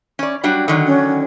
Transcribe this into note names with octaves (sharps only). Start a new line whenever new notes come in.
C#4 D5
F#3 G3 D4
D3 D#3 F#3
C#4